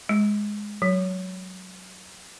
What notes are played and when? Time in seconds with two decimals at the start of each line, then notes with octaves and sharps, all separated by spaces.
0.09 G#3
0.82 F#3